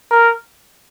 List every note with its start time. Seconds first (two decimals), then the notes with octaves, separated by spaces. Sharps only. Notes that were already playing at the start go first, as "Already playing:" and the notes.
0.11 A#4